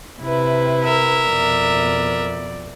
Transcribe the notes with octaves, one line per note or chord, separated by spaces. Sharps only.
C3 E4 B4
A#4 E5
F2 B2 D5